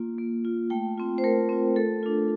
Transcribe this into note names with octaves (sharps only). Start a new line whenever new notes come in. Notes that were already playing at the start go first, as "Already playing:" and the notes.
Already playing: A#3 F4
A#3
F4
A3 G5
C4 F4
C5
A3 A#4
C4 F4
A3 A4
D4 F4